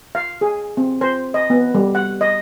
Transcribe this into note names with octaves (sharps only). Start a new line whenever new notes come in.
F5
G#4
C4
C5
D#5
B3
G3
F#5
D#5